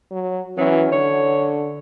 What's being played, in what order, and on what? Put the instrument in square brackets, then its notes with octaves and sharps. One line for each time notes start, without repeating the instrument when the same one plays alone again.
[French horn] F#3
[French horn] E3 [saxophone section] F#3 B3 C#4
[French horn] D3 [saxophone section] C#5